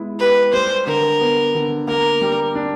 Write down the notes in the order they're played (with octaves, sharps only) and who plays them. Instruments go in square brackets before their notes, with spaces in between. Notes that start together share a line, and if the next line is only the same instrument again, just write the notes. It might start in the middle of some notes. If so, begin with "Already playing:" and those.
Already playing: [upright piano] G#3 B3 E4
[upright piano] G4 [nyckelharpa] B4
[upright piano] G3 [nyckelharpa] C5
[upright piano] D3 [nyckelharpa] A#4
[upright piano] B3
D3
[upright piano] A#3 [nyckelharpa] A#4
[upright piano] G3
D4